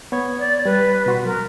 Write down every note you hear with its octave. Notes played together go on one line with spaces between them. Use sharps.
B3 C#5 G#6
D5
G3 B4
B2 F#4 C6
F#3 A#4